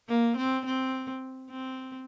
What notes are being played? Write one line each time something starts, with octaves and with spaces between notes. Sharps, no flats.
A#3
C4
C4
C4